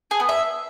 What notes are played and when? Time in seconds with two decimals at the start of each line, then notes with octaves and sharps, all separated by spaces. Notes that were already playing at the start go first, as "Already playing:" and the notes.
0.11 G#4
0.20 B3
0.29 E5